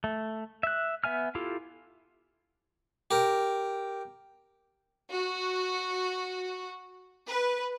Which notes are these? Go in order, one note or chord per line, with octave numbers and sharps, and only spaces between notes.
A3
E5 F#6
B3 E5 G#5 F6
E4 F4 G4 A4
G4 A#4
F#4
B4